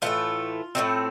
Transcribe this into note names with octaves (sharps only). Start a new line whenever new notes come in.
A2 E3 A3 F4
A2 F3 A3 C4